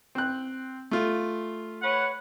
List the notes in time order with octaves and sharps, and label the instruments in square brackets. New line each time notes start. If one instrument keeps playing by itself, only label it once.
[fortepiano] C4 F#6
A3 F4
[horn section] B4 C#5 F#5